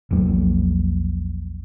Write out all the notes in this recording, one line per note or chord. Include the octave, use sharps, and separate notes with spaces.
A#1 E2 F#3 A#3